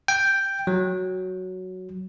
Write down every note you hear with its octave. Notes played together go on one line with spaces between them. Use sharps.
G5
F#3